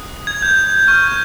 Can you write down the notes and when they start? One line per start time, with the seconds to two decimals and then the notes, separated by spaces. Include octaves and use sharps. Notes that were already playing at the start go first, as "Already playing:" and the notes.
Already playing: D#6 F#6
0.27 G#6
0.42 G6
0.87 C#6 F6
1.08 G6